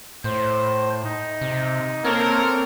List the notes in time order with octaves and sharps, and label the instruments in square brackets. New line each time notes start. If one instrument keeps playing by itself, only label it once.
[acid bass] A2 [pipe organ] C5
[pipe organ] D#4
[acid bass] C3
[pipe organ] A#3 A4 C#5 [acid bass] C4 [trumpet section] A#4